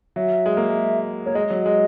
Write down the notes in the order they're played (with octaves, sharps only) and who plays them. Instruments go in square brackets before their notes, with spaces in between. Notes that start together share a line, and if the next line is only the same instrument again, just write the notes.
[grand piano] F#3 [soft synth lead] E5
[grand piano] G#3
A#3
G#3
[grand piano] A#3 [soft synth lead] C#5
[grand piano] G#3 [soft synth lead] D#5
[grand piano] F#3
G#3